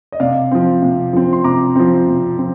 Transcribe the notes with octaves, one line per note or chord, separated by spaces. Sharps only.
D#5
C3 D5 F5
F3 C4
C3
F3 C4
C6
C3 A#5 D6
F3 C4
C3
F3 C4